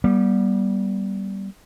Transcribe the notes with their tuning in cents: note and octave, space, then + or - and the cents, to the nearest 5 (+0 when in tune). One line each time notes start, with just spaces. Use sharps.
G3 -10 B3 -40